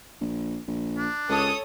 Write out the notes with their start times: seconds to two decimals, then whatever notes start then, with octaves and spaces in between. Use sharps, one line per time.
0.21 A#1
0.68 A#1
0.97 D4
1.29 C#2 A4 C#5 D#6